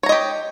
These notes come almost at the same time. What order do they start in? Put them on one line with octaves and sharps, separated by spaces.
C#5 A#5 D#5 G4